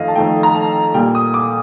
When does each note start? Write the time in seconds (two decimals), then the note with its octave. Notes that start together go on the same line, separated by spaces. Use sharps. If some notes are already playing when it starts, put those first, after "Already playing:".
Already playing: F2 D#3 A3 D#5 F5
0.08 A5
0.15 F2 D#3 A3 G5
0.43 A#5
0.55 A5
0.94 A#2 G3 A#3 G5
1.15 D#6
1.34 D6